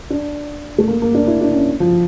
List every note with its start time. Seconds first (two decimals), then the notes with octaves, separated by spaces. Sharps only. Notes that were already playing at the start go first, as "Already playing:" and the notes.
0.10 D4
0.78 A3
0.88 A#3
1.02 A#3
1.14 D4
1.27 E4
1.41 D4
1.54 C#4
1.80 F3